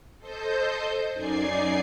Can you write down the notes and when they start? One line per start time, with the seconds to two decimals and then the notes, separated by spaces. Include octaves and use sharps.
0.18 A4 C5 D#5 G6
1.13 F#2 D#4 D5 G#5 G#6 C7